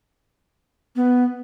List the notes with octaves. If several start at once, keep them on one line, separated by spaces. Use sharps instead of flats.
B3